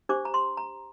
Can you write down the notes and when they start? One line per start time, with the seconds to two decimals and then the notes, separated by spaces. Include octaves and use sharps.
0.09 D4 G4 C5 D6
0.25 A#5
0.34 C6
0.57 A#5